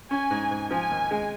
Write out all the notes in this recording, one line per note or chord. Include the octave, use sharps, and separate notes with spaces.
C#4 G#5
G#2
G#2
F3 G#5
D#2
G#3